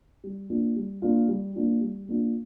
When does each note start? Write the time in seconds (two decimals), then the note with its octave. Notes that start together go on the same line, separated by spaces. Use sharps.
0.24 G3
0.50 A#3 D4 F4
0.76 G3
1.02 A#3 D4 F4
1.28 G3
1.56 A#3 D4 F4
1.81 G3
2.09 A#3 D4 F4